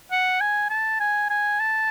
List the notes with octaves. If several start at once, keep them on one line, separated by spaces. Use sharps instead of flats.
F#5
G#5
A5
G#5
G#5
A5